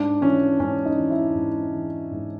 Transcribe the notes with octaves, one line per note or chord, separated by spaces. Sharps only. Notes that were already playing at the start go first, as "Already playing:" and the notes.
Already playing: G#2 D4
E3 C#4
G#2 C#4
D#4
E3
E4
G#2
E3
G#2